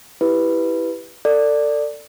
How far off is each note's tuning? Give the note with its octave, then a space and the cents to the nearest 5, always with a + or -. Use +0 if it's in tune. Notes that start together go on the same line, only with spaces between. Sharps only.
E4 +0 G4 +0 B4 +0
A4 +35 D5 +0